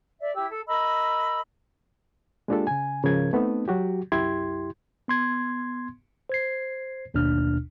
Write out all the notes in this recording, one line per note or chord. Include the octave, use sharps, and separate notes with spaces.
D5 E5
E4 G4 E6
A4
A#4 D#5 B5 E6
G#3 A#3 D4 F4 G4 A4
C#3 G#5
G#2 C#3 F3 A#4 G#6
A3 B3 C4 D#4 A4
F#3 F#4 G4
C2 F#2 E4 G4 C6 G#6
B3 C6 G#6
C5 G#6 C7
G1 D#2 B2 D4 F6